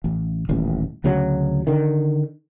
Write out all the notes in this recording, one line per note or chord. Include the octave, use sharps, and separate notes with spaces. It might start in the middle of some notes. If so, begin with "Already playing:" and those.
A1
D#1 A1
D2 C#3 F#3
D3 D#3